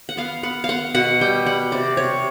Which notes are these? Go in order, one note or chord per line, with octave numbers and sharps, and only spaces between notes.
F#5
B3 F5
B3 F#5
F5
B3 F#5
B2 F#5
G3 G5
G3 F#5
C3 D5
C3 C#5